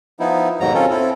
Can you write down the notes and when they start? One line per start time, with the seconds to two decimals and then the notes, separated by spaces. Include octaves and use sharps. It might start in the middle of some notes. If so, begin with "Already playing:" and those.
0.20 F3 B3 D#4 E4
0.60 D#2 G#2 B2 F#3 A#5
0.74 C4 C#4 F4 A4
0.90 C4 E4 A4